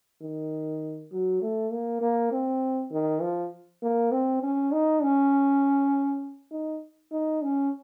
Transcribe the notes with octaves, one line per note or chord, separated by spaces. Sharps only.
D#3
F#3
A3
A#3
A#3
C4
D#3
F3
A#3
C4
C#4
D#4
C#4
D#4
D#4
C#4